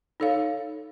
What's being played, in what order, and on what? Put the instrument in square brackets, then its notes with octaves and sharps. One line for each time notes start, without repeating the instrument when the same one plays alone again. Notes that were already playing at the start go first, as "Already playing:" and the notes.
[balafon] D#4 A4 C#5 F5